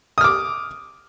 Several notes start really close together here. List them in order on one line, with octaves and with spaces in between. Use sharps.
D#6 F6 D6